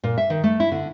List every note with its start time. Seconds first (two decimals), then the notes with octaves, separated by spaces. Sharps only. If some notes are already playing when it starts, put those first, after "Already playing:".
0.04 A#2
0.18 E5
0.30 D#3
0.44 A3
0.60 E4
0.72 D3